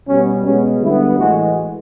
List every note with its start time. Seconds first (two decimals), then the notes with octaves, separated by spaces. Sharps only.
0.08 B2 G3 B3 C#4
0.45 B2 G#3 B3 C#4
0.81 D3 G3 B3 E4
1.17 A2 E3 G#3 F#4